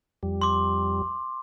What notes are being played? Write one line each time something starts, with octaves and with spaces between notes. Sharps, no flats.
F2 G3
C6 D6